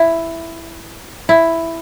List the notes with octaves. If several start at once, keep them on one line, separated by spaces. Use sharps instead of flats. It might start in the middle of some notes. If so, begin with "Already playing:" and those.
Already playing: E4
E4